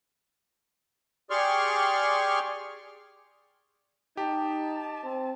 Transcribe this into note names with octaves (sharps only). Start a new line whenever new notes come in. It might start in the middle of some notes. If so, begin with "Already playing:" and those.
G4 G#4 D5 C6 C#6 F6
D#4 G4 A5
C4